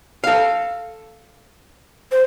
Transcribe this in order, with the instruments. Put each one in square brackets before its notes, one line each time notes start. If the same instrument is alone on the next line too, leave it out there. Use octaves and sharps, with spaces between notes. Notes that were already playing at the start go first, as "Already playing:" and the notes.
[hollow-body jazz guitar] A4 F5
[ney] C5